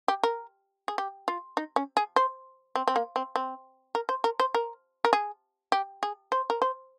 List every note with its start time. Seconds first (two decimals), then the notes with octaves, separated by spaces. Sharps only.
0.08 G4
0.23 A#4
0.88 G#4
0.98 G4
1.28 F4
1.57 D#4
1.76 C#4
1.97 G#4
2.16 C5
2.75 C4
2.88 C4
2.96 A#3
3.16 C4
3.36 C4
3.95 A#4
4.09 C5
4.24 A#4
4.40 C5
4.54 A#4
5.05 A#4
5.13 G#4
5.72 G4
6.03 G#4
6.32 C5
6.50 A#4
6.62 C5